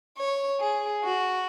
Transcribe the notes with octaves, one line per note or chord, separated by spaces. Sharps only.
C#5
G#4
F#4